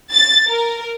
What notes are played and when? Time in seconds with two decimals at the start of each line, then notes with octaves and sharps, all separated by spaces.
0.11 A6
0.49 A#4